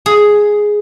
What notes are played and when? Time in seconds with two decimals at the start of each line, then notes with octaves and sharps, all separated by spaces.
0.06 G#4